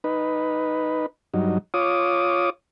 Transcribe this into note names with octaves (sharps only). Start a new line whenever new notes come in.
D#4 B4
G2 F#3 D#4
F4 C#5 D6 D#6